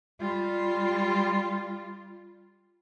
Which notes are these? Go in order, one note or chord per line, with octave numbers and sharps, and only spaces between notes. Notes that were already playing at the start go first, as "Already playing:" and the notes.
G3 F4